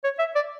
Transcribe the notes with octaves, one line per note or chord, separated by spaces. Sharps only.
C#5
E5
D5